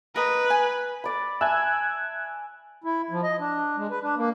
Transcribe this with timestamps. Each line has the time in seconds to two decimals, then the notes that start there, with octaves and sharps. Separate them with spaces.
0.16 A#4 B4 D#5 A#5
0.50 G#5
1.04 D5 B5
1.41 E5 G#5 A5 E6 F#6 G#6
2.84 E4
3.10 F3
3.24 D#5
3.40 D4
3.77 G#3
3.90 B4
4.03 D4
4.17 A#3